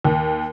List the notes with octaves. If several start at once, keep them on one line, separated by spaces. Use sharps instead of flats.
D#2